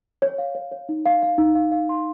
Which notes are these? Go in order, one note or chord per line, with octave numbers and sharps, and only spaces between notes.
C#5
F5
C#5
C#5
D#4
F5
F5
D#4
F5
F5
C6